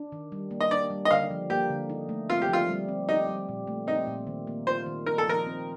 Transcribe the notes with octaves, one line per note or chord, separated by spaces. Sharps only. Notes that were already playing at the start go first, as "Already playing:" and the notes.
Already playing: D4
D#3
G3
A#3
D#5
D4 D5
G3
D#5
D3 F5
F3
A#3 G4
D3
D#4
A3
C4 F4
G4
F3 F4
G3
C4
D#4 G4
G3
A#2
A3
C4 D#4
A#2
D#3
A#3
F4 C5
D#3
D#4 A#4
A4
F3 A#4
C4